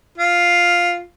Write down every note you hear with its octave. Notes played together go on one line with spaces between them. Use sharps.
F4